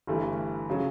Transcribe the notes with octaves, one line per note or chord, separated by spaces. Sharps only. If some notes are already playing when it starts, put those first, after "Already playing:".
G1 G2 E3 A3
C#3 F#3